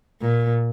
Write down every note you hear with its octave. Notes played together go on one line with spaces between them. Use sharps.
A#2